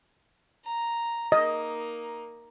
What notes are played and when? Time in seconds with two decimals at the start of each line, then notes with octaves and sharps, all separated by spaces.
0.65 A#5
1.32 A#3 D#4 D#5